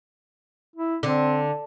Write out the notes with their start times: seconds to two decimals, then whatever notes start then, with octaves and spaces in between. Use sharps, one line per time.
0.76 E4
1.03 D3 C4